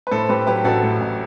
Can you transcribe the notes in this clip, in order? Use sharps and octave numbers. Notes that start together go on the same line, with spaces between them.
B4
A2 A4 C5
A2 G4 B4
F#3 G4 B4
A1 F#4 A4
A2
A1